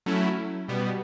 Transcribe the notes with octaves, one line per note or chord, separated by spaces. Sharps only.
F#3 A3 C#4 E4
B2 G3 B3